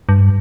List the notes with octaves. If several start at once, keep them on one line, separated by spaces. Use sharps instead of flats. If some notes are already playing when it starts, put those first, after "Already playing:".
G2